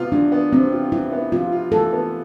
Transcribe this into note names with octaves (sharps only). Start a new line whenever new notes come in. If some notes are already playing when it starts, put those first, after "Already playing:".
Already playing: C3 B3 F4
E3 D4
B3
C3 C4
F4
E3 E4
B3
C3 F4
F4
E3 A4
B3